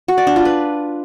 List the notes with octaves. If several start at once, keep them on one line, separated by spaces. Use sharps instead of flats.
F#4
D5
D4
F4
B4